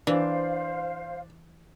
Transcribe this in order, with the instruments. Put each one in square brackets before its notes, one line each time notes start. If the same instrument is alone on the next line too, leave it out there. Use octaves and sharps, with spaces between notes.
[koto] E3 [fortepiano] D4 [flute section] C5 F5